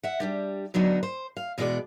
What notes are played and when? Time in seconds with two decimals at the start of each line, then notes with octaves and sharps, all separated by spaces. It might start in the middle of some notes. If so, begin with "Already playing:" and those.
0.03 E5 F#5
0.20 G3 D4 G4
0.74 D3 F#3 B3 D4 D#4
1.03 C5
1.37 F5
1.58 E2 B2 G#3 B3 F#4 D5